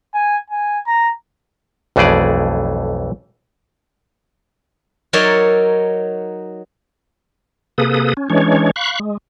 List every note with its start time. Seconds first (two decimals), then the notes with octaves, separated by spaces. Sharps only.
0.14 G#5
0.50 G#5
0.87 A#5
1.96 B1 F2 E3 A3 G#4 D5
5.13 F#3 D#4 A#4 C#5 D5 E5
7.78 C3 A#3 G#4 A4 B4 D#6
8.17 C#4
8.30 E3 G#3 C#4 D4 C#5
8.76 F5 B5 C#6 F#6
8.99 G#3